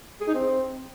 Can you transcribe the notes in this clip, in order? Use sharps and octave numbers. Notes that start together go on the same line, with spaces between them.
G#4
D#4
C4